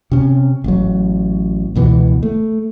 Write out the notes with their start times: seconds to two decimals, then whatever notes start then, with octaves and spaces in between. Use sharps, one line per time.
0.12 C3 C#4
0.64 A1 F#3
1.75 C#2 B2 E3 B3
2.23 A3